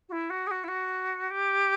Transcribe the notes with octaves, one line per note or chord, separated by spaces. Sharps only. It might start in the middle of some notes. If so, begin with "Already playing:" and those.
F#4
E4
F#4
G#4
F#4
E4
F#4
G4